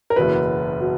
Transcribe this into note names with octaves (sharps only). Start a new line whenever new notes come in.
A#4
F#1 E2 B2 F#3 B4
B2 F#3